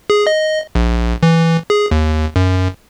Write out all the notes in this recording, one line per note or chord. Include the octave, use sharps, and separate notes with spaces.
G#4
D#5
A#1
E3
G#4
D#2
F#2